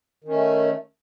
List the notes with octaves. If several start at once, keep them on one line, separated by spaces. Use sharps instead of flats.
D#3 A3 C#4